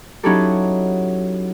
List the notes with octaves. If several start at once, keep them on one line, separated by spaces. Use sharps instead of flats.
F#3 C#4 D#4 E4 G4 A4